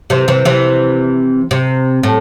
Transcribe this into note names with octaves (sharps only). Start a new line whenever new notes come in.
C3 E3
C3 E3
C3 E3
C3
A2